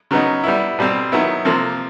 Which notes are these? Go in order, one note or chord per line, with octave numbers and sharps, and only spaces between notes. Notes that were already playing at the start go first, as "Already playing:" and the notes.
C#3 F#3 B3 D#4
G3 B3 E4
B2 G3 C4
D#3 F#3 B3 E4
C3 F3 A#3